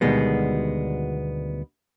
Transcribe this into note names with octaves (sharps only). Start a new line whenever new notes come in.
D2 B2 D#3 G3 G#3 B3